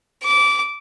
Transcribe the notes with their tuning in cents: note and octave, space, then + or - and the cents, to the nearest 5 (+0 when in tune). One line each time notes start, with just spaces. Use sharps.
D6 -20